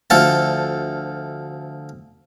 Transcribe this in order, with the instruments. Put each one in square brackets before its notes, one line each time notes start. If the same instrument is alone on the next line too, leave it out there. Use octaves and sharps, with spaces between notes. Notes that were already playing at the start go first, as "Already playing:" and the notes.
[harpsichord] D2 F3 A4 A5